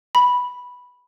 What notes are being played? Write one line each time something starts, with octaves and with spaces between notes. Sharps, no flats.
B5